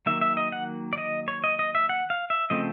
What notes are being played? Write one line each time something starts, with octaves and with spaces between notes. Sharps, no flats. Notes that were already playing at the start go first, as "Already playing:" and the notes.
D#3 F#3 A#3 E5
E5
D#5
F#5
D5
D#5
C#5
D#5
D#5
E5
F#5
F5
E5
C#3 F3 A3 C4 D#5